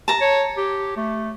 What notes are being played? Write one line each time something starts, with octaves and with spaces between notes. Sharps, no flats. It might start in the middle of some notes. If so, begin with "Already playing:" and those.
A5 A#5
C#5
G4
A3